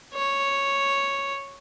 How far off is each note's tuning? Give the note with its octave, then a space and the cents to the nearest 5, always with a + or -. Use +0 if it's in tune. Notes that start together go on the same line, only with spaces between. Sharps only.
C#5 +0